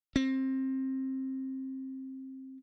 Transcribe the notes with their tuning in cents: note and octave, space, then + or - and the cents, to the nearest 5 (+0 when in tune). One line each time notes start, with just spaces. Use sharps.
C4 +20